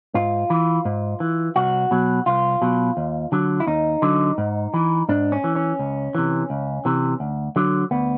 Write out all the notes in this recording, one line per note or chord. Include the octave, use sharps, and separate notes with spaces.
G#2 F4
E3
G#2
E3
C2 F#4
B2 F#3
C2 F4
B2 F#3
D#2
D3 F#3
E4
D#2 D#4
D3 F#3
G#2
E3
G#2 D4
C#4
E3
C#4
C#2
C3 E3
C#2
C3 E3
D2
D3 F#3
D2 B3